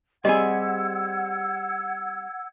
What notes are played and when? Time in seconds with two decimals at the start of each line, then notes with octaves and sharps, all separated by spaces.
0.25 G3 C4 G4 G#4 D#5 F#5 E6 G#6